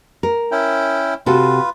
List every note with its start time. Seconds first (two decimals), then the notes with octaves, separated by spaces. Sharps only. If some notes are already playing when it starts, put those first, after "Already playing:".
0.23 A#4
0.52 C#4 E4 G5
1.26 C3 F4 F#4 A4 B4